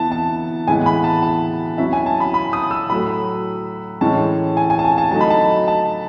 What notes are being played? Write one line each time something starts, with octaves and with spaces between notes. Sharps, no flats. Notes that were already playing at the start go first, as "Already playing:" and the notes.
Already playing: E3 B3 E4 A5
A5
A2 E3 G#3 B3 E4 G#5
B5
A5
A5
F#3 C#4 E4 E5
G#5
A5
B5
B5
D#6
E6
A2 F#3 A3 B5
A2 E3 G#3 C#4 A5
G#5
G#5
A5
G#5
A5
F#3 A3 D#4 A5
B5
A5
A5